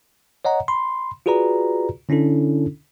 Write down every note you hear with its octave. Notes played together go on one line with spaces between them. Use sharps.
C#5 D#5 F#5 A#5
B5 C6
F4 F#4 G#4 B4 D5 A#5
D3 C#4 D4 E4 A4